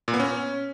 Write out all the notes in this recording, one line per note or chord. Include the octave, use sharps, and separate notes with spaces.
A#2
B3
C#4